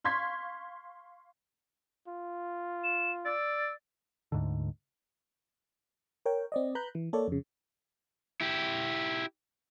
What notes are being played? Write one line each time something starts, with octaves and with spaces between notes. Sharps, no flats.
F5 C6 C#6 G#6 B6
F4
E7
D5 E6
D2 G#2 D3
A#4 C#5 G5
C4 D5 D#5
B4 A#5 B5 F#6 G6
E3
A#3 A4 C#5 D5
F2 C#3
E4 G4